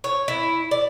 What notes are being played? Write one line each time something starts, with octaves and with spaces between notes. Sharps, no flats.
C#5
E4
D5